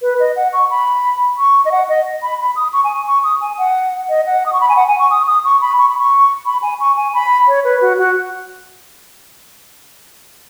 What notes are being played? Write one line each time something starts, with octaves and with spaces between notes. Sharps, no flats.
B4
D#5
F#5
C#6
B5
C#6
D#5
F#5
D#5
B5
B5
D#6
C#6
G#5
C#6
D#6
G#5
F#5
D#5
F#5
D#6
C#6
B5
G#5
F#5
G#5
C#6
D#6
D#6
C#6
B5
C#6
B5
C#6
B5
G#5
C#6
G#5
B5
C#5
B4
F#4
F#4